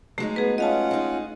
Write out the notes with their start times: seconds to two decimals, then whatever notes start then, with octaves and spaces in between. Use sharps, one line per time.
0.18 F#3 G#3 A3 D#4
0.36 B3 G#4 B4
0.58 C#4 F4 D#5 F5 F#5 A5
0.91 G#3 D#4